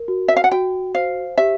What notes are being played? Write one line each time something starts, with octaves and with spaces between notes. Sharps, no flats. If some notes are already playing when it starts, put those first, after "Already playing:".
Already playing: A#4
F#4
E5
F5
F#5
F#4 G5
C5 F5
G4 E5